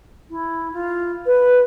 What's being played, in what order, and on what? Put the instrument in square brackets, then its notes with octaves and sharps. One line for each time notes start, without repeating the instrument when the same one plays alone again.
[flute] E4
F4
B4